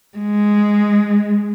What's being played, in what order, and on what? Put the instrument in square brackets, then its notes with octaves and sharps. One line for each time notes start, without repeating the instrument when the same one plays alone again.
[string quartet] G#3